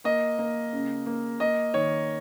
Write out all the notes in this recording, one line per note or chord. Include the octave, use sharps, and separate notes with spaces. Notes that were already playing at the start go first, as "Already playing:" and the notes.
A#3 D#5
A#3
C#3
A#3
A#3 D#5
D#3 C#5